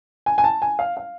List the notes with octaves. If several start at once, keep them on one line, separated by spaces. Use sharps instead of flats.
G#5
G#5
A5
G#5
F5
F5